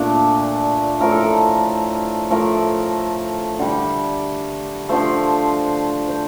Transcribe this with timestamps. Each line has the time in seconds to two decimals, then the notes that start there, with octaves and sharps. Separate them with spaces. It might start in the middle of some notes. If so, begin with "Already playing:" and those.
Already playing: A#2 A3 D4
1.00 A2 F3 A3 A#4
1.11 A4
1.23 A#4
2.30 A2 F3 A3 A#4
3.59 D3 G3
4.89 D3 F3 A3 C5
6.08 C5